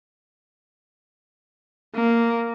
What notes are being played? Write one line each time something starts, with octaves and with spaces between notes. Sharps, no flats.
A#3